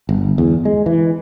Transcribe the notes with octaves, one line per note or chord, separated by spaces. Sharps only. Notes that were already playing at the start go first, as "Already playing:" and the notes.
G1
E2
G#3
E3